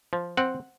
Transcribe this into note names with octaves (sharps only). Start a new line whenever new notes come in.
F3
C4 F#5